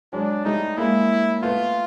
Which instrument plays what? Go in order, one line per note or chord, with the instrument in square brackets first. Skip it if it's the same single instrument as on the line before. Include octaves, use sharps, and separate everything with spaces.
[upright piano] F#3 G#3 [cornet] D4
[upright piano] G3 A3 [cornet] D#4
[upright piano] G#3 A#3 [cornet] E4
[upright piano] A3 B3 [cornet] F4